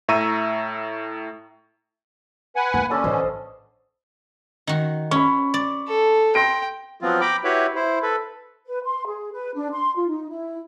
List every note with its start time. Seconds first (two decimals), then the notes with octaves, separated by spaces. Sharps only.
0.08 A2 E5 A#5 C#6 E6 D#7
2.56 B4 F#5 G#5
2.74 A#3
2.90 D3 C#4 D4 A4
3.04 A1 B4 C5 D#5
4.67 D#3 F#4
5.11 C#4 B5 C#6
5.54 D5
5.88 A4
6.35 G5 C6 A#6 D7
7.01 F3 F#3 B3 C4 F4
7.21 G5 A#5 B5 D6
7.44 E4 F#4 G4 B4 C#5 E5
7.76 E4 C5
8.03 A4 B4
8.66 B4
8.84 C6
9.06 G#4
9.33 B4
9.55 D4
9.71 C6
9.96 F4
10.08 D#4
10.30 E4